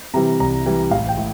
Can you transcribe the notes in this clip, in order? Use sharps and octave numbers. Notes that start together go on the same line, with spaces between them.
C3 E3 G3 A#5
C2 A#5
C3 E3 G3
A1 F5
G5
A2